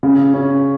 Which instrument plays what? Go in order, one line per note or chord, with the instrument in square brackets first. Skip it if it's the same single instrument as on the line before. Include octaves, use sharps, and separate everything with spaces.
[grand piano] C#3
C#4